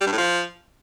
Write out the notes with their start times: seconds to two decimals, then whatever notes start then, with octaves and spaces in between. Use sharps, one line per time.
0.01 G3
0.07 G2
0.12 A2
0.18 F3